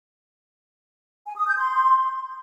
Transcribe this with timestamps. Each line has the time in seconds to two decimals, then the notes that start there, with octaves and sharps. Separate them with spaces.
1.26 G#5
1.36 D#6
1.47 G6
1.57 C6